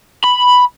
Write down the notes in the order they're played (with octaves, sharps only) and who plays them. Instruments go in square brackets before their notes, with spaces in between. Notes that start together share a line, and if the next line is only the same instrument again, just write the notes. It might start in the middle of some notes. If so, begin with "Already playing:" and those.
[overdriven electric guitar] B5